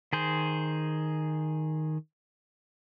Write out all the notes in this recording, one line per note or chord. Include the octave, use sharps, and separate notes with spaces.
D#3 G#4 C5